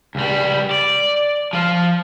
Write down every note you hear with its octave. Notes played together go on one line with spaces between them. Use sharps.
C#2 G3
D5
F3 F4